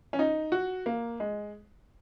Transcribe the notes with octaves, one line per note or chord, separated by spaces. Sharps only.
C#4
D#4
F#4
A#3
G#3